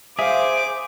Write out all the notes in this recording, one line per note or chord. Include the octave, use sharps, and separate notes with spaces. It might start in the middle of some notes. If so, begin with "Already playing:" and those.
G#4 C5 E5 F5 D6